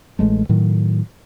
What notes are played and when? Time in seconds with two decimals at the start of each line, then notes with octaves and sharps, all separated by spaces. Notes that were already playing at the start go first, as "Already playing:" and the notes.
0.19 A1 G#3 A3
0.49 A2 D#3 F#3